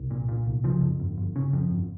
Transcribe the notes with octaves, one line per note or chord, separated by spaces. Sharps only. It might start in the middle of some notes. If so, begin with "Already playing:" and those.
Already playing: C2
A#2
A#2
C2
C#3 F3
F2
G1
G1
C#3
F2
G1